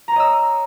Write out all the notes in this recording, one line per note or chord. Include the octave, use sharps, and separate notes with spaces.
C#5 D#5 A#5 E6